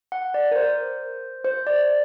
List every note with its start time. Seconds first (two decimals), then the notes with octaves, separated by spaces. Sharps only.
0.12 F#5
0.34 D5
0.51 A#4
0.56 C5
1.45 C5
1.67 D5